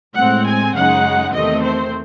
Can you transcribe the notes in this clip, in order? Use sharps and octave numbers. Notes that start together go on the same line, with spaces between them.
A2 G#3 C4 F#5
G#5
F#2 C#3 G#3 D#4 F#5
E2 C3 D#3 A3 C4 D#5
C5